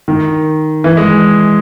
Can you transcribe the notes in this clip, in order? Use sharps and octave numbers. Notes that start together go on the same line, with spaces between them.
D#3
E3
G#3